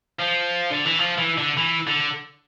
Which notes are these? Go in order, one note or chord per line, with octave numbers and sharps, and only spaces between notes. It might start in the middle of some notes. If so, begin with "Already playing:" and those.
F3
D3
E3
F3
E3
D3
E3
D3